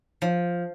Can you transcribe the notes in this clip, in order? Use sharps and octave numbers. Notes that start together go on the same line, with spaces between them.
F3